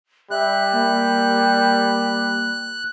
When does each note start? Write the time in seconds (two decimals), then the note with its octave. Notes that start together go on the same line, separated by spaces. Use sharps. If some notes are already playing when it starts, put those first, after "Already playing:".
0.31 G3 E5 F#6
0.72 A#3